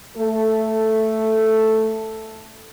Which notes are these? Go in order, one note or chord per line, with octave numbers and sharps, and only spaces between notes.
A3 A4